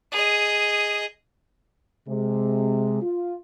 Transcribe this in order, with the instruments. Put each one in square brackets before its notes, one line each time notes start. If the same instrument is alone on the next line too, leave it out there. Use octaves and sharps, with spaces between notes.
[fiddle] G#4 D#5
[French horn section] C3 G#3
F4